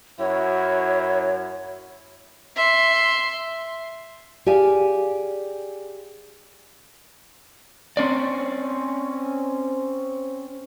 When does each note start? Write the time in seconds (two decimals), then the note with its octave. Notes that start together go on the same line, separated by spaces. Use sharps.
0.19 F#2 E4 F#4 C#5
2.56 E5 C6
4.46 G4 G#4 D5 F5 G#5
7.97 C4 C#4 D5